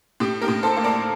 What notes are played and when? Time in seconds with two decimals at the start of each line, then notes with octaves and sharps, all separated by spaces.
0.20 A2 G4
0.41 G4 A#4
0.48 A2
0.63 A4 C5
0.77 A#3
0.84 A#4 D5